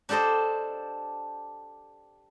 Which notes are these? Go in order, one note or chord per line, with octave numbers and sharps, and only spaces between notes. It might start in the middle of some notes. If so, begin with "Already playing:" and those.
D4 G4 A4 C5 D#5